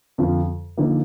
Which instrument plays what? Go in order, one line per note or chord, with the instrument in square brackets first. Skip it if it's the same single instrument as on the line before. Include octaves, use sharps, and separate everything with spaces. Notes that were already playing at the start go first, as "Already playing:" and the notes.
[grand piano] F2 D3 F3
D3 F3 A#3 D#4